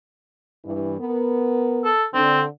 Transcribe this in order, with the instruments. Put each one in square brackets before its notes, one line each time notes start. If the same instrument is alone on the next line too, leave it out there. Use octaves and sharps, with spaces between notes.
[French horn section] G2 E3
B3 A#4
[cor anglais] A4
[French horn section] D3 [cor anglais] C4